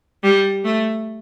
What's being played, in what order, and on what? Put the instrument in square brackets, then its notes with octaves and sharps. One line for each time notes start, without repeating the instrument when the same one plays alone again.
[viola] G3
A3